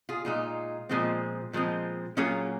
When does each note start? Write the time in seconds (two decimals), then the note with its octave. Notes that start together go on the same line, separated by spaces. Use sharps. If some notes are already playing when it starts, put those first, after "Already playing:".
0.09 F4 G#4
0.25 A#2 G#3 D#4 F4
0.89 A#2 F3 G#3 C4
1.53 A#2 F3 G#3 C4
2.17 A#2 F#3 A#3 C#4 F4 G#4